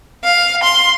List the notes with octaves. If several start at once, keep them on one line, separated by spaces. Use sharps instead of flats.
F5
C6